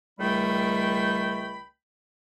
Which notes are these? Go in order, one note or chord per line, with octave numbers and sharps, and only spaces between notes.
C#2 D#3 G3 A3 G5 B5